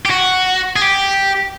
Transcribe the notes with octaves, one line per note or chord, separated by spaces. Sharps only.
G4
F#4
G#4
G4